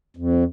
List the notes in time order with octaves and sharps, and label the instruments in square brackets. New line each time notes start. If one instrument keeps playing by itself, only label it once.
[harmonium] F2